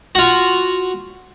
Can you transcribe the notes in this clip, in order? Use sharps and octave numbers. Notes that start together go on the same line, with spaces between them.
F4 F#4